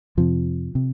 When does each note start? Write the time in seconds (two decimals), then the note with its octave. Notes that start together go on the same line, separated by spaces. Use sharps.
0.17 F2 C3 F3
0.75 C3